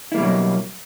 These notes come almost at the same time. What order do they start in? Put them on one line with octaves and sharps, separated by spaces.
E4 A#3 G3 B2 F#3